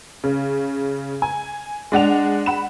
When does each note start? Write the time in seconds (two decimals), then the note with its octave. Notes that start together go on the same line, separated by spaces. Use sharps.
0.24 C#3
1.22 G#5
1.92 G#3 D4 F#5 F7
2.46 F#5 B5 E7